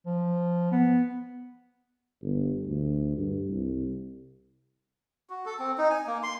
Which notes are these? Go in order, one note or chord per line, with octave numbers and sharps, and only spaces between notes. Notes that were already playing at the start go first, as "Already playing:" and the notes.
F3
B3
G1
D2
G2
C2
F#4
A4
C4
D#4
G#5
A#3
C6